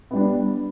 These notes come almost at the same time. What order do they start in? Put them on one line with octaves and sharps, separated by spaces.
B3 G3 D4